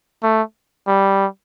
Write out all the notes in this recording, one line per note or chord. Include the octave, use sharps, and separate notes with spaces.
A3
G3